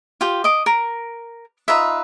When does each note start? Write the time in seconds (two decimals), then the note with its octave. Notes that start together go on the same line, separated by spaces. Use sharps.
0.21 F4 G4
0.44 D#5 D6
0.66 A#4
1.68 D#4 F4 B4 E5